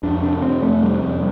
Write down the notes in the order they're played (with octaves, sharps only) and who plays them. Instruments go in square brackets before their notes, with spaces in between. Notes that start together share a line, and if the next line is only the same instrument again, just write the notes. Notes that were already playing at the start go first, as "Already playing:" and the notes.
[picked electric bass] F2 D4
C3 D4
F2 C4
F2 A3
C3 G3
F2